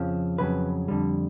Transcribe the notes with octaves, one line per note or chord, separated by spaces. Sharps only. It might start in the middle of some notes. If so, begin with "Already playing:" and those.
Already playing: F2 C#3 F3
F2 C#3 F#3 B4
F2 D3 G3